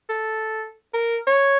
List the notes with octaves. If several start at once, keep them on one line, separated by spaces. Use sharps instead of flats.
A4
A#4
C#5